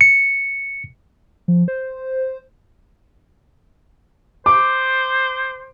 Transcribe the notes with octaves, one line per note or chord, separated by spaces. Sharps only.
C#7
F3
C5
C5 D6